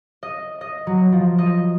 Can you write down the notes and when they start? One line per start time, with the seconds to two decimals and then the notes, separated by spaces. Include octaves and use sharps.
0.23 D#5
0.61 D#5
0.87 F#3
1.12 F3
1.38 D#5